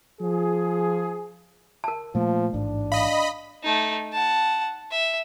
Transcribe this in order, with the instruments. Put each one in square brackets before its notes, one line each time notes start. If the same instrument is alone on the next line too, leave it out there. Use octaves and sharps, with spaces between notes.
[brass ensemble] F3 G#4
[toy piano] A#4 A5
[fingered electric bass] A#2 A3 A#3 [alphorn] F3
[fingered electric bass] A1 G#2 [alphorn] D4
[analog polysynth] D#5 B5 [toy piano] F5
[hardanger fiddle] A3 D#4
F#5 A5
E5